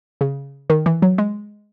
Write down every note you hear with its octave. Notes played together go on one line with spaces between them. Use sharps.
C#3
D#3
E3
F#3
G#3